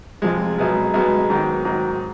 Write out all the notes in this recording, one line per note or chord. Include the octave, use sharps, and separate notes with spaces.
F2 C3 F3 G#3
B1 B2 G#3 B3
B1 B2 G#3 B3
G#2 D#3 F#3
G#2 D#3 F#3